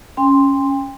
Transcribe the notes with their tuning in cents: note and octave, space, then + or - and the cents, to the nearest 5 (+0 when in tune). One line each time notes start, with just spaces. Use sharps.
C#4 +0 G5 +35 C6 +0